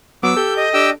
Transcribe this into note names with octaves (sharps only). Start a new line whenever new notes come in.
F#3 B3 D6 E6
G4 A4 G6
D#5
D4 G4 G5 E6